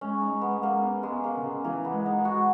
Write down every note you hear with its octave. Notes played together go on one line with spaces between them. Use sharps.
G#3 C#4
D#4
G#3
B3
G#3
A#3
B3
G#3
B3
A#3
C#3
G#3
E3 A#3
B3
G#3
D#4
G#3
F#4